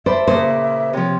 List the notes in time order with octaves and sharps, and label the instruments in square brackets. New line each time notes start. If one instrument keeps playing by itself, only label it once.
[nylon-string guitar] C5 [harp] D5 A5 B5 [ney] E5
[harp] A#2 C#3 D6 [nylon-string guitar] C5
[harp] C3 F3 [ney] C#5